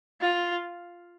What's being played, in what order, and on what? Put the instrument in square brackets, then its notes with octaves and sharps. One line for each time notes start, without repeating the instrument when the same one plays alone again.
[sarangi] F4